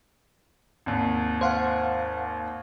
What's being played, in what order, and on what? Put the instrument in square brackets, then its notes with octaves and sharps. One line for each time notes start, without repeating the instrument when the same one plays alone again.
[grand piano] G#1 D#2
[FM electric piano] C5 F5 F#5